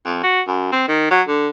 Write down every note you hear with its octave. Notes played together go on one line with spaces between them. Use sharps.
F2
F#4
F#2
C4
D#3
F#3
D3